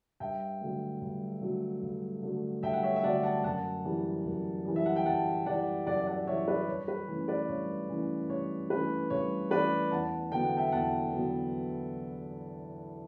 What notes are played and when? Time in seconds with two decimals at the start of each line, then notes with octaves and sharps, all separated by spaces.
0.20 G2 E5 G5
0.61 D3 F#3 A3
1.02 G2
1.42 D3 F#3 A3
1.82 G2
2.22 D3 F#3 A3
2.63 G2 E5 G5
2.73 F#5
2.83 C#5 E5
2.96 E5
3.04 D3 F#3 A3 D5 F#5
3.23 F#5 A5
3.44 F#2 F#5 A5
3.85 E3 G3
4.25 F#2
4.65 E3 G3
4.76 E5
4.86 F#5
4.96 G5
5.06 F#2 F#5 A5
5.46 E3 G3 D5 F#5
5.87 F#2 D5 F#5
6.07 D5 F#5
6.27 E3 G3 C#5 E5
6.48 B4 D5
6.68 G2 C#5
6.88 B4
7.08 E3 A3 C#4
7.28 B4 D5
7.49 G2 C#5
7.89 E3 A3 C#4
8.30 G2 C#5
8.70 E3 A3 C#4 B4
9.10 G2 C#5
9.51 E3 A3 C#4 B4 D5
9.91 E2 F#5 A5
10.32 D3 F#3 B3 G5
10.45 F#5
10.57 E5 G5
10.72 E2 F#5 A5
11.13 D3 F#3 B3